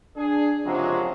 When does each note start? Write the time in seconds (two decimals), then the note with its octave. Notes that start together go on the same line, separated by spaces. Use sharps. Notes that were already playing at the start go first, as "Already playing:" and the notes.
0.16 D4 G#4
0.65 F#1 C3 F3 F#3 G#3 A#3